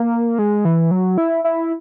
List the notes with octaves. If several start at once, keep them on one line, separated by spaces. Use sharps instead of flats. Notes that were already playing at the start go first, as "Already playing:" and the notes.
Already playing: A#3
G#3
E3
F#3
E4
E4